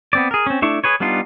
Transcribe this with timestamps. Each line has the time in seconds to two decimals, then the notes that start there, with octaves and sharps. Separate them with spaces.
0.13 B3 C4 D5
0.31 G#4 A#4
0.47 C4 C#4
0.62 A3 D4 E4 C#6
0.84 G#4 B4 C#5
1.00 G3 B3 D4 D#4 F4